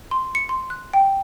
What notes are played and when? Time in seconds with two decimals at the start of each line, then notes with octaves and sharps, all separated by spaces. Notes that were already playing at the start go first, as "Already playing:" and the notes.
0.11 C6
0.35 C#7
0.49 C6
0.70 F#6
0.93 G5